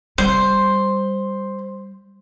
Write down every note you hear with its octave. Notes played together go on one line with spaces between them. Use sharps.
G3 C5